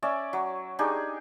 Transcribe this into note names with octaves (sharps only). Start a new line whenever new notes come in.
C#4 D5 E5
F#3
D4 D#4 G4 G#4